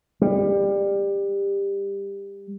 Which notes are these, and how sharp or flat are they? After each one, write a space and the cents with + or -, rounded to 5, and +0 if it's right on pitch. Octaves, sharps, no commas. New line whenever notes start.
G3 +20